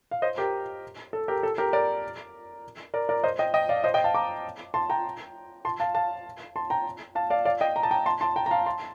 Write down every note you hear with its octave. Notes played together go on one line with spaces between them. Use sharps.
F5
C5 D#5
G4 A#4
A4
G4 A#4
A4
G4 A#4
A#4 D5
A#4 D5
A#4 D5
C5 D#5
D#5 G5
D#5 G5
D5 F5
C5 D#5
D#5 G5
F5 A5
A#5 D6
A5 C6
G5 A#5
A5 C6
F5 A5
F5 A5
A5 C6
G5 A#5
F5 A5
D5 F5
D5 F5
D#5 G5
A#5
A5
G5 A#5
A5 C6
A5 C6
G5 A#5
A#5
F5 A5
A5 C6